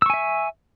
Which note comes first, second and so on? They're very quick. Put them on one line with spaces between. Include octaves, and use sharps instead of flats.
E6 C#6 G#5 E5